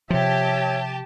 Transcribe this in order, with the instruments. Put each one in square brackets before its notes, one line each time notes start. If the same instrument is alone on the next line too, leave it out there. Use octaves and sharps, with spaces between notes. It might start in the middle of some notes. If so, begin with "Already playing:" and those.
[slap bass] C3 F3 [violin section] G4 A5 [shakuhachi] C#5 [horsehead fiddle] E5